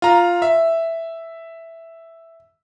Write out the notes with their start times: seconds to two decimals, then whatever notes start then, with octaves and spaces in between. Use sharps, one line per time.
0.02 F4 A#5
0.42 E5